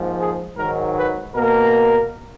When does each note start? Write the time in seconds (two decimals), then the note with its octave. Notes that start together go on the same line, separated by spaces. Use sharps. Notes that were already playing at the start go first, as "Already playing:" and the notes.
Already playing: G#2 F3 A#3
0.19 G#4
0.57 G#2 D#3 F#3 A#4
0.97 B4
1.36 B2 A#3 A#4